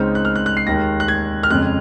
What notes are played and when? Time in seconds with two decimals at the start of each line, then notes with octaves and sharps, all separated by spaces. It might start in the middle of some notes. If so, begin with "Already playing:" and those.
Already playing: C#2 C#3 G#3 C4 D#4 F6
0.15 F#6
0.25 F6
0.36 F#6
0.46 F#6
0.57 C7
0.67 D#2 D#3 G#3 A#6
1.00 F#6
1.08 G#6
1.43 F6
1.50 F2 C#3 G#3 F#6